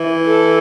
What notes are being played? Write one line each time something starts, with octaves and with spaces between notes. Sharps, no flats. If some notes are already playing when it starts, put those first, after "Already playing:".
Already playing: E3
A4